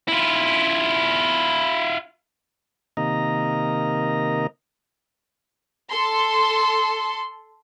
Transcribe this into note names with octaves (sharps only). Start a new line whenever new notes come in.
E4 F4
C3 D#3 A#3 D#5 A#5
A4 C6